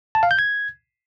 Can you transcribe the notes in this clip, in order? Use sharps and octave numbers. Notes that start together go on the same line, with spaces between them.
A5
F5
G6
G#6